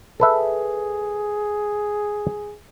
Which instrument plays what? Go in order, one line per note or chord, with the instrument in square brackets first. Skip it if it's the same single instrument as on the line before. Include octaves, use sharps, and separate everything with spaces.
[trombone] G#4 [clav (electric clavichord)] A4 B4 E5